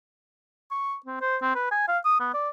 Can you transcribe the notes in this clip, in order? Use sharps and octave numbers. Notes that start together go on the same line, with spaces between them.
C#6
C4
C5
C4
B4
G#5
F5
D#6
B3
D5